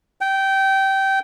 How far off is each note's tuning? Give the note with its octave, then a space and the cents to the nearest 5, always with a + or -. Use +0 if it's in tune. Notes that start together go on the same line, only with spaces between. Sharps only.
G5 -20